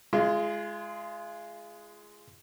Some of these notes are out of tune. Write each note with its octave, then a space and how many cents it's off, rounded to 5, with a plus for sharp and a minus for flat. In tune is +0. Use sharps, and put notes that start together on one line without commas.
G#3 +10 F4 -30